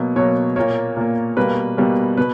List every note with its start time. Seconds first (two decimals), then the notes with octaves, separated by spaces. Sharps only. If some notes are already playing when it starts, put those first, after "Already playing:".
Already playing: B2 F#3 A#3
0.16 B2 F#3 A#3 C#5
0.56 A#2 A#3 C#5
0.97 A#2 A#3
1.37 B2 G3 A#3 B4
1.77 B2 G3 A#3
2.17 B2 B4